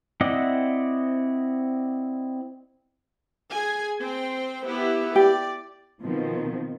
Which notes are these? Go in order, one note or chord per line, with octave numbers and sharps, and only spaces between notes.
C4 E4 D5 D#5 F#5
G#4 G#5
C4 C5 G5
B3 E4 G4
G4 D5
B2 D#3 F3 C4